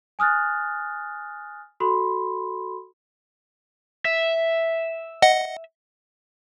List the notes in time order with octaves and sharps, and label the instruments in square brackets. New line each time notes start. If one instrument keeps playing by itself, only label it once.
[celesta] G#5 D#6 F6 F#6 A6
F#4 A4 B5 C6
[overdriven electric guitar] E5
[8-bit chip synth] D#5 F#5